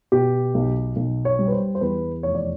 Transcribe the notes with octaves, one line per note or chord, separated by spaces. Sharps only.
B2 G4
B1
B1
C#5
G3
B4
C5
C5
E2 B4
F1 C#5
D5